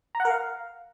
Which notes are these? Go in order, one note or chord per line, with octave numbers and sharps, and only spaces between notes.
A#5
F#5
A#4
F5